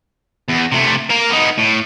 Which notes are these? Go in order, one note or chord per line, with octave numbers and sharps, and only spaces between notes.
E2
C3 A3
A#3 F5
B3 D#4
A2